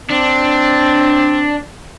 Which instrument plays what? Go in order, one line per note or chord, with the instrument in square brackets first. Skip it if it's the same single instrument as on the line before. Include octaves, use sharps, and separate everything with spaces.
[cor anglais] C4 [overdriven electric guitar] D4